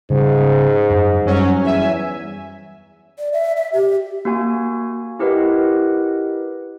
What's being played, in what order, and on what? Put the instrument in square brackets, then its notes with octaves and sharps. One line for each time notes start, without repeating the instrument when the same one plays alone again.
[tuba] G#2 [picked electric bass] C#3 G3
[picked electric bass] F#2
[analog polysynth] F#2 F#3 C#4 [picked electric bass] G3
[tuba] E2 [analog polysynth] E5 G#5
[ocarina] D5
E5
E5
G4
[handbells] A#3 F#4 G#5
E4 G4 A#4 B4 D#5 F#5